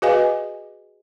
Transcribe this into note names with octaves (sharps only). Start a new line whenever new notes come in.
F#4 G#4 B4 D#5 F5 G#5